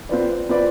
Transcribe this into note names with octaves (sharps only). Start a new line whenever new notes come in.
C4 F4 B4 D5
C4 F4 B4 D5